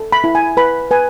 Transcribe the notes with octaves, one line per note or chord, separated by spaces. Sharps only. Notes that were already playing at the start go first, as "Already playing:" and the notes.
Already playing: A4
B5
E4
G#5
B4 B5
B4 G#5